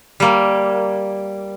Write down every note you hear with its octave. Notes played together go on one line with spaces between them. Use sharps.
G3 A#3